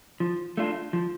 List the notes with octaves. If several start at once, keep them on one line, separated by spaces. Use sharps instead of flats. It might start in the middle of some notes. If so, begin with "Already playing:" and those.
F3
A3 D4 F4
F3